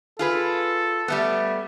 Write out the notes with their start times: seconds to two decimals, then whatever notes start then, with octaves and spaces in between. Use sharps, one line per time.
0.19 F4 G#4 A4 B4
1.08 G3 A3 B3